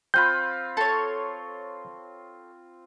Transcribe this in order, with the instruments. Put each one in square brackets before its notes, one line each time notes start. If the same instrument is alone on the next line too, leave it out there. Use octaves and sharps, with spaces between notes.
[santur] C4 F4 B5 [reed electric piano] G6
[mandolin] A4 C#5 [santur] C6